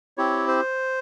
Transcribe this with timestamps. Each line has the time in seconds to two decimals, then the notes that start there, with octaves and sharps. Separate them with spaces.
0.18 C4 E4 G4 C#5
0.48 C5